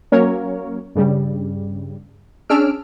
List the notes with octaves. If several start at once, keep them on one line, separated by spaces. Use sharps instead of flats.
F#3 A#3 C#4 A#4 C#5
G2 C#3 G3
C#4 D4 G#4 E6 F6 D7